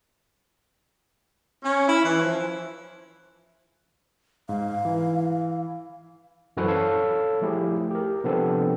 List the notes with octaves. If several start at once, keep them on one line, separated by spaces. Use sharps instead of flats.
C#4
E4
E3
F3
G#2 F5
E3
F#2 E3 F#4 A4 B4 C5
A4 C#5 F5
F3 A3 E4 G4 G#4
G4 A#4
C3 F3 B3 C4 D4 A4